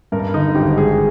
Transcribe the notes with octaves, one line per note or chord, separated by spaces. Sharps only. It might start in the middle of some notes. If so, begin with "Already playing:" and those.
G2 A#4
D3 D#4
G#1 G4
G#3 G#4